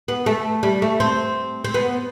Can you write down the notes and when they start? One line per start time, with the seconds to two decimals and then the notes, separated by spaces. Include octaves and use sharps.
0.08 B3
0.26 A3
0.63 G3
0.82 A3
1.00 C4
1.64 C4
1.74 B3